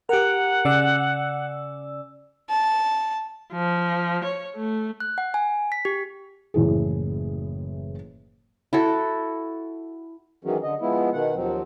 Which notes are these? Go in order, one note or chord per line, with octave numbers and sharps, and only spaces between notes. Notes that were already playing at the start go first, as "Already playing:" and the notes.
G4 A#4 F#5
C#3 D5 E6
A5
F3
C#5
A3
F#6
F#5
G#5
B6
G4
F#1 A2 E3 G#4
E4 F#4 A4
D#3 E3 F#3 G#3 C#4
D3 D#5
F3 G#3 B3 E4
B2 D#3 F#5
D#2 F3 F#3 C4